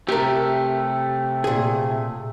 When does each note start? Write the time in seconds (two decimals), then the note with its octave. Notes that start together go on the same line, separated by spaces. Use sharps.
0.09 C3 A3 G4 A#4
1.44 A#2 G#4